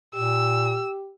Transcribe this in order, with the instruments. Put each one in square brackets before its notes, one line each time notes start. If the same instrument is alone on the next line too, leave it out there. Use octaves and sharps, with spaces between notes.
[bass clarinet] A#2 [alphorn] G4 [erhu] E6